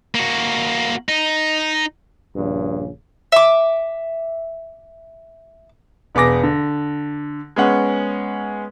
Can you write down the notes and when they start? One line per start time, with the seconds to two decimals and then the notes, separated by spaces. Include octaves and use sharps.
0.15 A#3 F#4
1.09 D#4
2.36 A#1 G2 C#3
3.32 E5 D6
6.15 E1 B3 G#4 D6 A#6
6.44 D3
7.56 G#3 B3 C#4 F#5